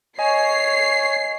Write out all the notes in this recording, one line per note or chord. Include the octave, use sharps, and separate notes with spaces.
C#5 D#5 G#5 C7